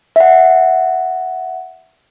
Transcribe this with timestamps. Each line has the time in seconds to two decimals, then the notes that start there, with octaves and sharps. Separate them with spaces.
0.16 E5 F#5